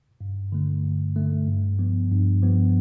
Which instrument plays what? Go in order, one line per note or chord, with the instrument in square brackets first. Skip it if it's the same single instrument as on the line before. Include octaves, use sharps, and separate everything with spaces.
[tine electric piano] G2
D3 A3
G2
D3 A3
G2
F3 B3
G2
F3 B3